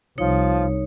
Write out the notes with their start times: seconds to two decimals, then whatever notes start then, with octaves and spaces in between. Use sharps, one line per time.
0.18 C2 F3 D#4 C#5